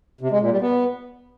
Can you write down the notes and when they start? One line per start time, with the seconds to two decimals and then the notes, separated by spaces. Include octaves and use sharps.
0.21 C3
0.31 G#3
0.41 A#2
0.51 G3
0.61 B3